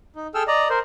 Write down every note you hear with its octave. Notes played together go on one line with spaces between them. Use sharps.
D#4
G#4 A4 G5 E6 F6
D5 D#5 A#5
A#4 C5